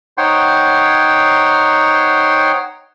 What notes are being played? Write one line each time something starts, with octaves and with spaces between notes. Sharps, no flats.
D#4 C5 C#5 F#5 G5 C6